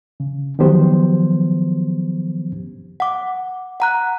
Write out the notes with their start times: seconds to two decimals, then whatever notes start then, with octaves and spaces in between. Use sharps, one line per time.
0.20 C#3
0.59 D#3 F3 F#3 B3 G4 C5
3.00 F#5 D6
3.80 F#5 A#5 F#6